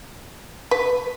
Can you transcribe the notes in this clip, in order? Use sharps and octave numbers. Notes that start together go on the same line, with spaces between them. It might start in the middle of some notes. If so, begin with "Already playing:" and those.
B4